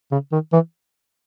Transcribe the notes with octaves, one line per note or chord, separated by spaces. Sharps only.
C#3
D#3
E3